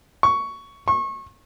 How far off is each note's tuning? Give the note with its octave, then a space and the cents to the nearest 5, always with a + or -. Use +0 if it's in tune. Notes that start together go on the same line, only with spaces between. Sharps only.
C#6 +10
C#6 -30